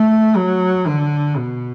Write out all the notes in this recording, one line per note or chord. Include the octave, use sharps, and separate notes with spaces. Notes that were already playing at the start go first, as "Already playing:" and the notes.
Already playing: A3
F#3
D3
B2